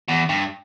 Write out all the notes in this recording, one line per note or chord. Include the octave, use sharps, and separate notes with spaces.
E2
G2